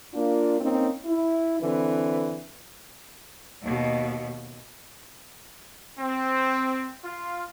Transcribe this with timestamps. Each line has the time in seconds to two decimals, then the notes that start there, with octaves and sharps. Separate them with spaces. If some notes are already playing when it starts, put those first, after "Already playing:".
0.13 A#3 D4 F4
0.60 A#3 C4 C#4 D#4
1.05 E4
1.61 D3 E3 C4 B4
3.62 D#2 B2
5.99 C4
7.04 F4